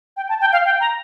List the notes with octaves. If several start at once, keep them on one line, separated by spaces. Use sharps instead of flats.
G5
A5
G5
F5
G5
A#5